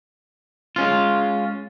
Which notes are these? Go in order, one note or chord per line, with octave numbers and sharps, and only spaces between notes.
G#3 C#4 F4